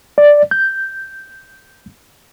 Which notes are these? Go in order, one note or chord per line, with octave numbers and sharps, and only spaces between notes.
D5
G6